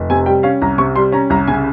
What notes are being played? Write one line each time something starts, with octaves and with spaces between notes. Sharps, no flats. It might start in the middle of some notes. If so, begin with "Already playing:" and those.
Already playing: F1
C3 G#5
G3 G5
C#4 F5
C2 A#5
C3 C#6
G3 C6
C#4 A#5
C2 A#5
C#3 G#5